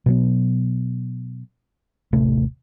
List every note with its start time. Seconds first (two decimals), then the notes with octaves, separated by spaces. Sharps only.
0.06 B2 F#3 B3
2.12 D#1 A1 C3 A3